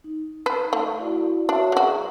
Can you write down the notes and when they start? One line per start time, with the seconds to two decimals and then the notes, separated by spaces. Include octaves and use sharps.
0.04 D#4
0.46 B4
0.73 A3
0.99 E4 F#4 D5
1.49 D4 F#4 C#5 E5
1.72 F#3 F#4 G#4